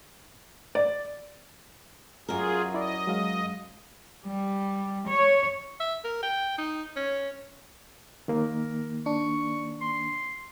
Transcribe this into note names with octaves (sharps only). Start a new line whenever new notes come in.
D5
F#2 F4 G#4 A#4
E4 D5 D#5
F#3 G#3 F5
G3
C#5
E5
A#4
G5
D#4
C#4
D#3 A#3 A#4
D4 C#6
C6